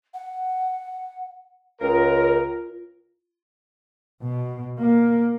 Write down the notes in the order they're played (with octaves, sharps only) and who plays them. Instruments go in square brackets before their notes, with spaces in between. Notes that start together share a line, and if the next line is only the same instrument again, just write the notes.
[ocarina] F#5
[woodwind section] C#2 [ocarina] F4 [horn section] A#4
[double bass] B2
A#3